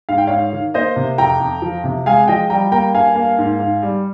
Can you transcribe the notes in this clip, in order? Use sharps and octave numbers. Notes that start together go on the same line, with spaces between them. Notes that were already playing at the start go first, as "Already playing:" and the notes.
G#2 F5
G5
G#2 C#5 F5
D#3
A#3 C5 D#5
C3
F2 G5 A#5
F2
F3
C3
G#3 F5 G#5
F3 D#5 G5
G3 G5 A#5
A#3 G5 A#5
G2 F5 G#5
A#3
G#2
G#2
G3